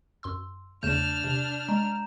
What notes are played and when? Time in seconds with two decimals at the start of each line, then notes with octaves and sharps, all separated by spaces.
0.23 F#2 C6 E6
0.83 E2 C#3 A3 D4 F6 G6 E7
1.24 C3
1.69 G#3 A#5